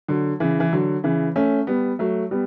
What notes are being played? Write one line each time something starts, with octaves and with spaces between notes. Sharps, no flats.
D3 F#3
C#3 E3
E3
D3 F#3
C#3 E3
A3 C#4
G3 B3
F#3 A3
G3 B3